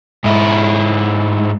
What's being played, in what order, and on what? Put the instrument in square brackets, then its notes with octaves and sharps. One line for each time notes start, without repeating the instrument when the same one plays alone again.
[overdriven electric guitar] G#2 E4